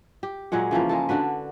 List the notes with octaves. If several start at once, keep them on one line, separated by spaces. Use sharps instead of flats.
G4
A#2 F#3 G#3 F#5
C#3 E3 F3 A#3
G#3 A#3 A4
D3 D4 F#4 B4